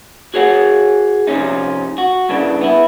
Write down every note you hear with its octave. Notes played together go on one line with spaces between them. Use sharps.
F#4 G#4 C#5 F#5
C3 F3 C#4 D#4
F#4
G2 C#3 E3 D4
B3 E4